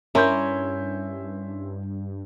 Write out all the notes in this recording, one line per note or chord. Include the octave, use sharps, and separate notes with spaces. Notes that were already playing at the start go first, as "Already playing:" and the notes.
G2 C#4 E4 A#4 D5 E5 C6 G6